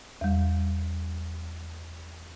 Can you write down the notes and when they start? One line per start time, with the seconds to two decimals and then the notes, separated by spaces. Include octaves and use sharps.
0.21 E2 G3